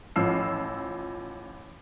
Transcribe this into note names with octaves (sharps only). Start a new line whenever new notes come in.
A1 F3 E6 C7